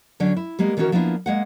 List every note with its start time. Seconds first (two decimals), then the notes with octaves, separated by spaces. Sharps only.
0.20 D3 F#3 C#4 D4
0.37 E4
0.59 G3 G#3 A#3 B3
0.77 D#3 E3 B3 C#4 F#4 A#4
0.92 F3 A#3 B3 D4 E4
1.26 G#3 A#3 F#5